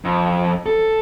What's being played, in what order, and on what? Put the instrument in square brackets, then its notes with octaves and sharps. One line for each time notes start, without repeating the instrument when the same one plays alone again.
[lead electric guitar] F2
A4